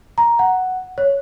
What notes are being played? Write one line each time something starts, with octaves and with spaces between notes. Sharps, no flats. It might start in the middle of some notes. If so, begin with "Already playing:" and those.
A#5
F#5
C#5